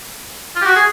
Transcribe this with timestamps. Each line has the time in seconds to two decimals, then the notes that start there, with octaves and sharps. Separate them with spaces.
0.56 F4
0.62 G4
0.66 F#4
0.76 G#4